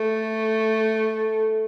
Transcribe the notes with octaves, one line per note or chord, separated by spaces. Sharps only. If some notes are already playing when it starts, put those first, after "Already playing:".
Already playing: A3